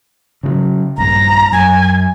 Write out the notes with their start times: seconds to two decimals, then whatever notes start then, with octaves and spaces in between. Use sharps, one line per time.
0.43 C#3 E3 F#3
0.98 A#1 G2 A#5
1.52 F#2 G#5